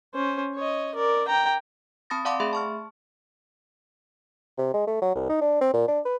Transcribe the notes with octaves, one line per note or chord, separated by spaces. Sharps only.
C#4 C5
C#5 D#5
A#4 D5
G5 A#5
C4 A5 B5 D#6 A6 A#6
D5 F5 F#5 A5 C6 D6
A3 G#4 E5 B5 C6 A6
A5 C#6 F6
C3
G#3
A3
F#3
C2
D#4
D4
C4
A#2
D4
B4